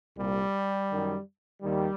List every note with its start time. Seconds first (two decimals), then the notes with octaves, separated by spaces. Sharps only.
0.17 C2 A#2 G3
0.90 F#2 D#3
1.62 D#2 D#3 G3